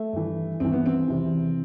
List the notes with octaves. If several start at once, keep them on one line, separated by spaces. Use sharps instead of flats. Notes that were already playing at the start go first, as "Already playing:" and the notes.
Already playing: A3
G2 E3
G2 E3 C4
B3
C4
E2 C3 E3